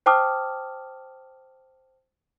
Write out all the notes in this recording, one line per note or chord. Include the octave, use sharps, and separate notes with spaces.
C5 G5 A5 D6 D#6 F6